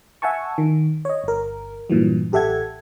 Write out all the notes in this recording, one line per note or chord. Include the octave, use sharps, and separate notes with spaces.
E5 F#5 G#5 A5 C#6
D#3
C#5 D#5
G1 A#4
G2 A#2 E3 F#3
A1 G4 A4 E5 F#5 G#6